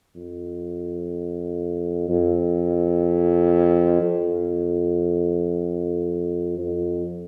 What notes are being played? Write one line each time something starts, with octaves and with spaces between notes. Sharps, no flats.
F2
F2
F2
F2